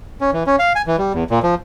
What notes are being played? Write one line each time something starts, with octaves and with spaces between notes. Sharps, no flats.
C#4
E3
C#4
F5
G#5
E3
G3
E2
A#2
F3